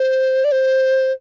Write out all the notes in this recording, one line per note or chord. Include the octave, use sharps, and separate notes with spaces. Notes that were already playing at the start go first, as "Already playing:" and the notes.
Already playing: C5
D5
C5